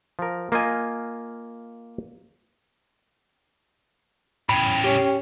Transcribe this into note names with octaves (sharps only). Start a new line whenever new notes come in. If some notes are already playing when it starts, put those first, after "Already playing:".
F3 A#4
A#3 F4 D#5 G#5
A2 C#3 G5 B5
C#4 G4